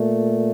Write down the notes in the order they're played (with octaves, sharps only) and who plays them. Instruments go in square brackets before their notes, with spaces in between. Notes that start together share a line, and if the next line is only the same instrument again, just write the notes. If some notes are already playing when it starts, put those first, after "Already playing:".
Already playing: [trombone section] A#2 A3